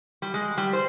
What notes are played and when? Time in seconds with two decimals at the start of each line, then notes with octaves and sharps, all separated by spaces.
0.22 G3
0.34 G#3
0.57 G3
0.73 C5